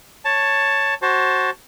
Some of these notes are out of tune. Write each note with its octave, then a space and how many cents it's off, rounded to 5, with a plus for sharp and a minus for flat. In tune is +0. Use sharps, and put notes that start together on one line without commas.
C#5 +0 A5 +10
F#4 +15 C5 +30 A5 +0